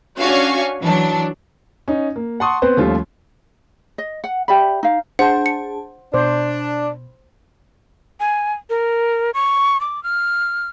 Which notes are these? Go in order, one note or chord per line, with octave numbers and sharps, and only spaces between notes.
C#4 D4 F#4 F5 G#5 C#6
E3 F#3 D4
C#4 D#4
A#3
F#5 A5 C6 C#6 D#6
B3 C4 B4 C5
D#2 F3 G3 A3 C#4 F4
D#5
F#5
G4 D5 E5 B5
D#4 F5
D4 G#4 C5 F#5 A5
C#7
B2 D4 C5
G#5
A#4
C#6
D6
F6